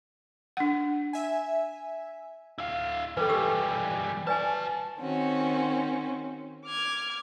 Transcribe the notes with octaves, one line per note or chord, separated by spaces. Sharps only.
D4 F#5
E5 G#5
E4 F5
E3 G3 A4 B4
G4 E6
F#4 B4 D5 G#5 A5
D#3 C4 C#4 F#4
D6 F6 G#6